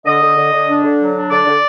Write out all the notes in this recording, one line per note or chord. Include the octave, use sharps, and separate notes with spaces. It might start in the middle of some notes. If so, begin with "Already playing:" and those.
D3 D#5
D3
D3
D3
D4
D3
F#3
D4
D3 D5
D3